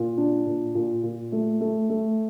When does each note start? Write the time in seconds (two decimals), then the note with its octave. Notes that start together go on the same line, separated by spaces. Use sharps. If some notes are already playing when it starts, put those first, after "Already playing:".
Already playing: A#2
0.17 D4
0.46 A#2
0.75 A#2
1.03 A#2
1.32 A3
1.61 A3
1.90 A3